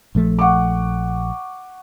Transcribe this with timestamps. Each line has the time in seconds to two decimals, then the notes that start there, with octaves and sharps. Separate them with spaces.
0.15 A#1 F3 A3
0.39 F#5 C#6 D6